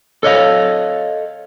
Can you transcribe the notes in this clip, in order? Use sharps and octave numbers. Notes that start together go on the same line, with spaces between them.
A4 C#5 D#5 F5